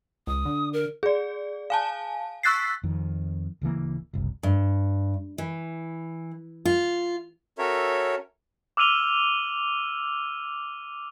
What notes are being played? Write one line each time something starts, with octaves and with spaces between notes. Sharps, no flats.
C#2 D#6
D3
A#4
G#4 D5
F5 G#5 A5
C#6 E6 F#6 A6 B6 C7
F2 D#3
D1 C#3 E3 A#3
F#1 C2
G2
E3
F4
C#4 F#4 A4 A#4 C#5 E5
D6 E6 F6 D#7 F7 G7